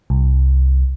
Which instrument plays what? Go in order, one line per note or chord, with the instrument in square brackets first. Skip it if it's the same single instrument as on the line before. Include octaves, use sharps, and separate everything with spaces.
[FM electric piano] C2